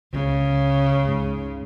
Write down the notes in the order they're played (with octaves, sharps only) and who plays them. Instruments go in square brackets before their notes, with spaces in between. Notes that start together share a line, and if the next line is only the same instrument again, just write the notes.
[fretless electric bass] C#2 [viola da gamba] C#3
[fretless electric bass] C#2 G#2